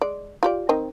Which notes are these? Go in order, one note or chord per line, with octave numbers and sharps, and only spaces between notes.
G#3 D5
F4 G4 D5
D#3 C4 D#5